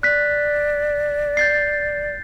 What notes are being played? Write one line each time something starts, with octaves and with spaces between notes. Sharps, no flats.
D5 F#6 B6
G6 A6 C7